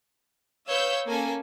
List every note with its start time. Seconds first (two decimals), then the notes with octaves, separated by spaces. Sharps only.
0.68 B4 C#5 F5 E6 G6
1.07 A#3 C#4 A4 G#5